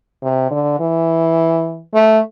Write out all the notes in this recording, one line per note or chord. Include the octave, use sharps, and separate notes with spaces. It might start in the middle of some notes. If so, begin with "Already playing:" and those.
C3
D3
E3
A3